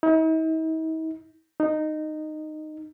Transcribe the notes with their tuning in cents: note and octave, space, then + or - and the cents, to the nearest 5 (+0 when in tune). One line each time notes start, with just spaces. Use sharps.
D#4 +45
D#4 -15